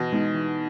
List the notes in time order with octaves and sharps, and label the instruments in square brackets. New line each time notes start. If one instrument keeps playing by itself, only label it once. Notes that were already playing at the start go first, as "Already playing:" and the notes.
Already playing: [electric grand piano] B2 [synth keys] E3
[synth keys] G#3 B3 D#4
E3